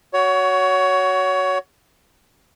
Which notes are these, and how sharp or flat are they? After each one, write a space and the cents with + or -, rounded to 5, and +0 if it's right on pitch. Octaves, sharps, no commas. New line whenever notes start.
F#4 +0 C#5 +20